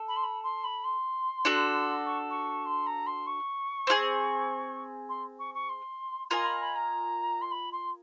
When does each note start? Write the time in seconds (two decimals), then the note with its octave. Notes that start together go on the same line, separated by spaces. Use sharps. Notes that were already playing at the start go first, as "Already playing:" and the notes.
Already playing: A4
0.08 B5
0.16 C6
0.23 B5
0.43 C6
0.64 B5
0.84 C6
1.45 D4 F#4 A4
2.06 C#6
2.30 C#6
2.65 C6
2.86 A#5
3.06 C6
3.27 C#6
3.87 C4 F4 G#4
5.09 C6
5.39 C#6
5.54 C#6
5.69 C6
6.30 F4 A#4 D#5 G#5 C6
6.45 B5
6.60 B5
6.76 A#5
7.41 C6
7.51 B5
7.72 C6